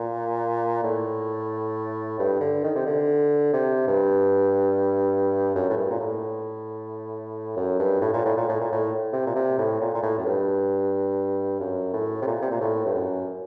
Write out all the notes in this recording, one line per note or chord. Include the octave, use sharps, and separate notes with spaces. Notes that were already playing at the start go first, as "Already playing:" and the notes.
Already playing: A#2
A2
G2
D3
D#3
C3
D3
C3
G2
F#2
A2
G2
A#2
A2
F#2
G2
A2
A#2
A2
A#2
A2
A#2
A2
C3
A#2
C3
A2
A#2
A#2
A2
F#2
G2
F#2
A2
C3
A#2
C3
A#2
A2
G2
F#2